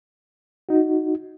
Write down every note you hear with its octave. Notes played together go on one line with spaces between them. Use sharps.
D#4 F#4